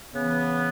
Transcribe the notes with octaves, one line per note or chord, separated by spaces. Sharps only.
C#3 E3 B3